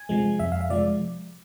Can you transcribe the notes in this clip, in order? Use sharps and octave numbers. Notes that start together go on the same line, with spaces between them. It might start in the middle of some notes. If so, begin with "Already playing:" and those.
Already playing: G#5
C3 F3 G#3
F2 E5
F5
E5
C3 F3 G#3 D5